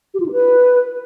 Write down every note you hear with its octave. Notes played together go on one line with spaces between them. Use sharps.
G4
F4
D#4
B4